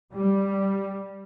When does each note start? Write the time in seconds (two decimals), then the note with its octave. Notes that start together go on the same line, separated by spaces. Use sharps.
0.14 G3